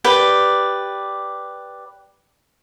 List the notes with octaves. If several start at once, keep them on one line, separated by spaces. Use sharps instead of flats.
G4 B4 D5